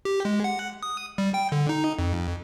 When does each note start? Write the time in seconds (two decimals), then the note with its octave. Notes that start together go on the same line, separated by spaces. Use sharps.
0.05 G4
0.25 G#3
0.44 F#5
0.83 D#6
1.18 G3
1.34 G5
1.52 D3
1.69 D#4
1.99 F2